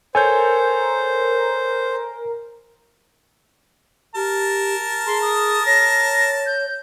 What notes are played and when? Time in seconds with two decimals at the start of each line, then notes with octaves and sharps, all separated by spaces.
0.15 A4 A#4 C5 C#5 G#5 G6
4.15 G4 A#4 A5
5.06 G#4 C6
5.22 D#6
5.66 C#5 A#6
6.46 G6